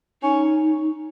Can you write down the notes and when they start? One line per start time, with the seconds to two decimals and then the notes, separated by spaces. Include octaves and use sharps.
0.22 C#4 D#4